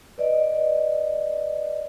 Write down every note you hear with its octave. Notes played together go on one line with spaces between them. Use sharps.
B4 D5 D#5